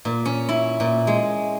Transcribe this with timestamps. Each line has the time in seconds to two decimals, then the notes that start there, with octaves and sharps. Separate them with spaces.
0.05 A#2
0.25 C#4
0.49 E4
0.80 A#2
1.07 G#3